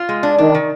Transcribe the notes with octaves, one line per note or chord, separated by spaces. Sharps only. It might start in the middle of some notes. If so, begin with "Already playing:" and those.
Already playing: F4
G#3
D4
D#3 D4
D#3